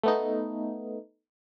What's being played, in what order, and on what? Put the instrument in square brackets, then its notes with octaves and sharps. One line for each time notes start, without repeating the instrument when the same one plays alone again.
[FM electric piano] A3 B3 D#4